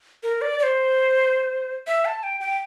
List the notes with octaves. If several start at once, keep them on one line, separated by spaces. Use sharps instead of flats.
A#4
D5
D5
C5
E5
A5
G5
G5